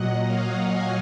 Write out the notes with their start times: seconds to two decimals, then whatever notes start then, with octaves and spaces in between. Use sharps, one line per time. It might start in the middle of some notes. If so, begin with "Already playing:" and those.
Already playing: A#2 F#3 D#5 F#5
0.24 C#5 F5
0.67 F5 G#5